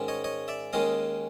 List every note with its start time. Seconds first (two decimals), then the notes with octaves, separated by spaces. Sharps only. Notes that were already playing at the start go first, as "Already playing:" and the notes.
Already playing: G#2 D#3 G#3 C#4
0.08 C#5 D#5
0.24 C#5 D#5
0.48 D5 E5
0.73 D#2 D#3 G#3 C#4 D#5 F5